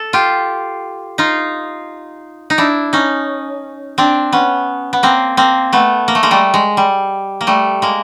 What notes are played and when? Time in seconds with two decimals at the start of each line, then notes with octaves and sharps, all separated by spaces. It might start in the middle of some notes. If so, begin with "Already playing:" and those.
Already playing: A4
0.13 F4 G4
1.18 D#4 F4
2.50 D#4
2.58 D4 E4
2.93 C#4 D#4
3.98 C4 D4
4.33 B3 C#4
4.93 B3
5.03 A#3 C4
5.37 A#3 C4
5.73 A3 B3
6.08 A#3
6.15 A3
6.23 G#3 A#3
6.31 G3 A3
6.54 G#3
6.77 G3
7.41 A#3
7.47 G3 A3
7.82 G#3 A#3